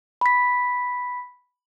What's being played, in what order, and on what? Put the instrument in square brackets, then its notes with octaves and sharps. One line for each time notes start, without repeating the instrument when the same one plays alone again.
[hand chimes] B5 B6